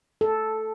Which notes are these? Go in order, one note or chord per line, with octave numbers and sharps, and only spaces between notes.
A4